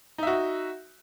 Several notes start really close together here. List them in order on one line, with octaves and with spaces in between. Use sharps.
D#4 E5 F#4